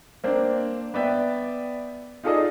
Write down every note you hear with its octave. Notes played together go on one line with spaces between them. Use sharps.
A#3 C4 D4
B3 D5 E5 G5
D#4 F4 G#4 A4 D5 D#5